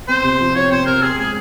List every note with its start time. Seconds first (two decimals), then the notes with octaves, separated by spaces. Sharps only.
0.08 C4 C5
0.24 C3
0.40 F3
0.55 F4 C#5
0.71 C4 C5
0.86 C3 A#4
1.02 G4 G#4
1.18 G#3 G#4